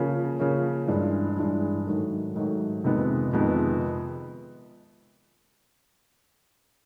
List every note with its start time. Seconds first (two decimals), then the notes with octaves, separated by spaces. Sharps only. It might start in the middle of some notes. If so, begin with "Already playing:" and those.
Already playing: C#3 F3 A#3 C#4
0.39 C#3 F3 A#3 C#4
0.87 G2 E3 G#3
1.37 G2 E3 G#3
1.86 G#2 D#3 F#3 A3
2.36 G#2 D#3 F#3 A3
2.84 F2 C3 D#3 G#3 B3
3.33 F2 C3 D#3 G#3 B3